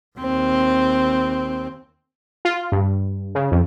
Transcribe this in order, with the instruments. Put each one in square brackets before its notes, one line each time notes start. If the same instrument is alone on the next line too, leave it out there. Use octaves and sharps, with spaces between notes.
[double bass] D#2 C4
[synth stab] F4
G2
C#3
F2